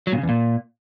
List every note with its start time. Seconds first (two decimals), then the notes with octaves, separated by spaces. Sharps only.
0.07 F#3
0.12 A#2
0.18 C#3
0.23 E2
0.29 A#2